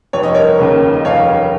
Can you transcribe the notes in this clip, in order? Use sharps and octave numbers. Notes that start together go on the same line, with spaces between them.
F1 C#5
D#5
A#4 C#5
D#2 C#3
D#5
F1 C#5 F5